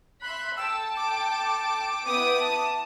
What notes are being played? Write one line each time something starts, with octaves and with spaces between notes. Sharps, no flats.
E5 B5 C6 F#6
A4 G5 A5 E6
D6
B3 E4 G5 D#6
A5